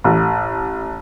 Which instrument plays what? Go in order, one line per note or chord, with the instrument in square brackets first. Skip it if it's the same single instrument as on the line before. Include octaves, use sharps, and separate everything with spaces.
[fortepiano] A1